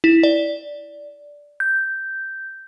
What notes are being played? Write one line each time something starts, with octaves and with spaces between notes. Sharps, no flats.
E4
D5
G6